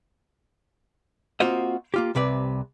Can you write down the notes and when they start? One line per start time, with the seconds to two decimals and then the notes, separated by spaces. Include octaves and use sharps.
1.40 A#3 C4 F4 F#4 C5 D#5
1.94 A#3 F4 G4
2.15 C2 C3 B4 D5